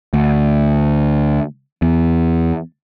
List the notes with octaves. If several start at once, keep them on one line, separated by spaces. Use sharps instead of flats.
D2
E2